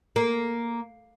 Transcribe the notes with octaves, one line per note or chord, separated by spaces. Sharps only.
A#3